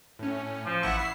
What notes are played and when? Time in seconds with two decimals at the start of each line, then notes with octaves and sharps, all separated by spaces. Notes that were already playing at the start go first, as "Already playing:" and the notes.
0.19 A2 C#4
0.66 F3
0.83 A1 E4 F#5 C#6
0.99 E4 C7